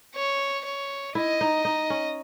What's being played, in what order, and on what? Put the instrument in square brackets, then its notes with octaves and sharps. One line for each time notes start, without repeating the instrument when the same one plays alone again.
[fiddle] C#5
C#5
[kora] E4 [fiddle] D#5
[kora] D#4
D#4
C#4